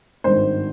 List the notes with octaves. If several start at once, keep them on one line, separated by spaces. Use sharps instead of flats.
G#1 G2 D#3 C5